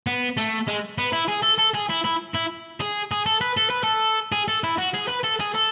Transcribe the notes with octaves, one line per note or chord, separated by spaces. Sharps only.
B3
A3
G#3
B3
E4
G#4
A4
A4
G#4
E4
E4
E4
G#4
G#4
A4
B4
A4
B4
A4
G#4
A4
E4
F#4
G#4
B4
A4
G#4
A4